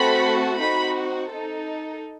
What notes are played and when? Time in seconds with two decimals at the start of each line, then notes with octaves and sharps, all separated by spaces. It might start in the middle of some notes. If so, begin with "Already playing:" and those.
Already playing: A3 C4 F#4 A4 B5
0.57 C4 D#4 F#4 B5
1.28 D#4 A4